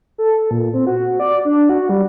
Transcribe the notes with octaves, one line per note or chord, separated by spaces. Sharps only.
A4
A#2
C4
F#4
D5
D4
F#4
G3